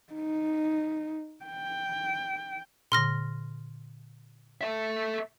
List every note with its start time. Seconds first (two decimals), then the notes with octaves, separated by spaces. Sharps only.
0.13 D#4
1.46 G5
2.92 A#2 D3 C6 F6 A#6
4.61 A4 E5